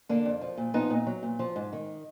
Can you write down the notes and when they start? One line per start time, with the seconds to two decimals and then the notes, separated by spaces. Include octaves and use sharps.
0.09 D3 A#3 D4
0.26 F2
0.41 F3
0.58 A#2
0.74 F3 B3 D#4
0.90 A#2
1.07 F#3
1.23 A#2
1.39 F3
1.56 G#2
1.73 D#3